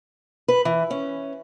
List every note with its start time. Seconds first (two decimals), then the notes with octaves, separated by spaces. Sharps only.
0.48 B4
0.65 E3
0.91 C#4